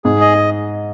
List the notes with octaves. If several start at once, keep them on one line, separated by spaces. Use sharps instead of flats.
G#2 G#4
D#5